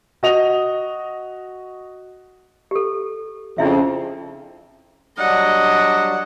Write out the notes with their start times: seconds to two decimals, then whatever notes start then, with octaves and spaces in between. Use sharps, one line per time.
0.23 F#4 D#5 F7
2.71 G4 A4
3.58 F2 C#3 D4 E4 E5
5.18 F#3 G3 D4 D#5 F#5